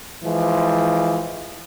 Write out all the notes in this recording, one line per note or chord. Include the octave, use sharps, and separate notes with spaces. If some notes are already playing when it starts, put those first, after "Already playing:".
E3 F3 G#3